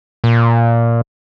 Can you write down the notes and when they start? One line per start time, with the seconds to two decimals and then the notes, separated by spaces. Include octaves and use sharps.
0.24 A#2